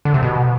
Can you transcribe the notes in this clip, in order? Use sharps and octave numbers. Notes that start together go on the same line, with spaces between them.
D3
C3
B2